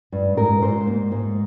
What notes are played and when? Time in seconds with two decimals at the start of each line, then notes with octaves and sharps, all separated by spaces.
0.12 G2
0.37 G#2 A#4
0.62 G#2 C5
0.87 A#3
1.12 G#2